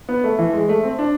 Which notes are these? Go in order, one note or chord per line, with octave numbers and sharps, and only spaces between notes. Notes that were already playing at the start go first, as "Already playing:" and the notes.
B3
A3
E3
G#3
A3
C4
D4